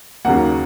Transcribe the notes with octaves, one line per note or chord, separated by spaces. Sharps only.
D#2 C#3 F#3 A#3 F#5